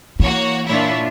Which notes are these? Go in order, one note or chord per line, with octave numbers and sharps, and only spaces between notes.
E3 A#3 F#4 C#5
A#2 D4 E4 F4 C#5 E5